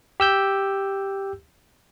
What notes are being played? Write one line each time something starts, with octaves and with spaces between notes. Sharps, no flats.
G4 E6 G6